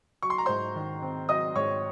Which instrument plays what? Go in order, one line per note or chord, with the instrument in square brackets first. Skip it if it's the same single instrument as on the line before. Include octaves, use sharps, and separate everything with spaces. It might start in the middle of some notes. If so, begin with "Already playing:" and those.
[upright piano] F#3 C#6
C6
A#5
G#2 C5 C6
D#3
C4
F#3 D#5 D#6
G#2 C#5 C#6